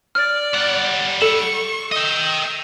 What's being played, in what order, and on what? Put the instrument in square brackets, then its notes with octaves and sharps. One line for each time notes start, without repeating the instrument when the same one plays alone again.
[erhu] D5 [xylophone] F6 A6
[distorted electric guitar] G3 F#5
[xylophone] A4 E7 [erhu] C#6
[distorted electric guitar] D#5 G5 [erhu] E6